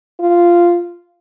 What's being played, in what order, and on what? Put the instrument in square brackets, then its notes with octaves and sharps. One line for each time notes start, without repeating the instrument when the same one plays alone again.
[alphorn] F4